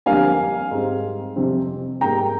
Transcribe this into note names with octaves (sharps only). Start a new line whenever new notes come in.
F2 D3 G3 A#3 F5 G#5
G#2 G3 C4
F2 C3 G3 C4
G#2 G3 A#3 G5 A#5